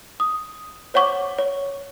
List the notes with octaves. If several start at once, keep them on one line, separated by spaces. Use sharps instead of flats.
D#6
C5 C#5 F#5 C#6 D6
C#5